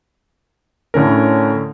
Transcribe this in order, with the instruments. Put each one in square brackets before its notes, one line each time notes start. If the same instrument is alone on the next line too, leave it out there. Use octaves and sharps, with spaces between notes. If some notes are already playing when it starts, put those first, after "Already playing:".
[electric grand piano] A2 D3 C#4 A#4